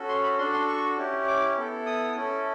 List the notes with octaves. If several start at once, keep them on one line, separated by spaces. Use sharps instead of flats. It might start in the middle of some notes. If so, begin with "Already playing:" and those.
Already playing: C#4 F#4 A4
C6
B5
D4 F#4 A4 C6
C6
C#6
C#4 E4 G4
D6
B3 E4 A4
D#6
C#4 E4 A4